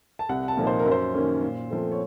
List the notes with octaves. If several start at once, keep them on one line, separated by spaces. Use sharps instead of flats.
A5
C2 F#5
A5
A#2 F3 A#3 D#4
C5
A#4
F#2
C5
D#3 A#3 C#4
A#2
F3 A3 C4
C#5